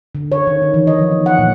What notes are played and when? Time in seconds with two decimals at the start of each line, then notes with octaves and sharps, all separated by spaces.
0.15 D3
0.32 C#5
0.47 D#3
0.62 D#4
0.74 E3
0.87 D#5
0.99 F3
1.12 B3
1.26 F#5
1.39 A#2